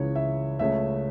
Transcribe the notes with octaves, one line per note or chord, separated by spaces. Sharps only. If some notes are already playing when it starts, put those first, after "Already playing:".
Already playing: C#2 C#3 E3 C#5
E5
C#2 C#3 A3 C#4 E5